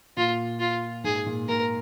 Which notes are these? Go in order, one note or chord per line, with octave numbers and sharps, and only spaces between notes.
A#2 F4
F4
G#2 G#4
A#2
A#2 A#4